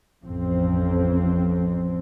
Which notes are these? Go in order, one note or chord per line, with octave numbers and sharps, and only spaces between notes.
A1 F2 C4